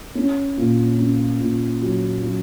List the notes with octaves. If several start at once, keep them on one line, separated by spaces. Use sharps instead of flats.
C#4
A#2
C#4
A#2
F#3
F#3